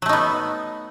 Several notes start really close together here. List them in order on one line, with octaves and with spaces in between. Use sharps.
F#3 A3 D#4 B3